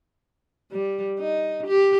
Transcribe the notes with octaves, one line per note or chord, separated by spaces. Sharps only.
G3
D#4
G4